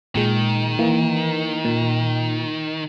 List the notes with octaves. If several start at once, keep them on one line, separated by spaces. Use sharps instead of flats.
A#2 D#3 G#3
E3 A#3
A#2